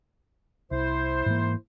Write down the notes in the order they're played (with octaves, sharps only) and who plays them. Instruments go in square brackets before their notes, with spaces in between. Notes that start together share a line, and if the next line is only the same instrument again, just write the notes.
[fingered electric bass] C2 [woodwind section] E4 C5
[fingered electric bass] G#2 E3 A#3